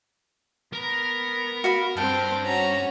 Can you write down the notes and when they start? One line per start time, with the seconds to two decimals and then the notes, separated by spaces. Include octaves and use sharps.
0.73 B3 A#4 A#5
1.64 F#4 F5 B5
1.97 G2 C4 G5 A5 F6
2.45 C#4 F#4 A#5